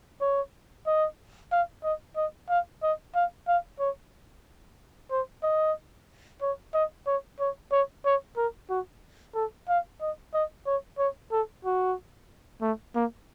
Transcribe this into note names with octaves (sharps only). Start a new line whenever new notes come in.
C#5
D#5
F5
D#5
D#5
F5
D#5
F5
F5
C#5
C5
D#5
C#5
D#5
C#5
C#5
C#5
C#5
A#4
F#4
A4
F5
D#5
D#5
C#5
C#5
A4
F#4
A3
A#3